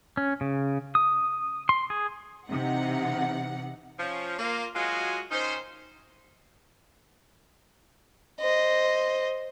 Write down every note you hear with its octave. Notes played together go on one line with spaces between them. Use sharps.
C#4
C#3
D#6
C6
G#4
C3 E3 D#4 F#5
F3 C#4
A#3 F4
F#3 G#3 F4 F#4 D#5 G#5
D#3 C#4 D#4 C5
C5 D#5